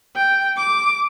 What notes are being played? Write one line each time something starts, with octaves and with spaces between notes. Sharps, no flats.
G5
D6